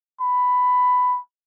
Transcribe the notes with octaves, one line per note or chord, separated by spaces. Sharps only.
B5